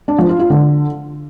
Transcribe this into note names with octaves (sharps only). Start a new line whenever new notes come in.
D4
F3
F4
F4
D3